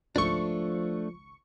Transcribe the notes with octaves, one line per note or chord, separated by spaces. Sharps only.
G#1 C#2 F3 A3 D4 C#6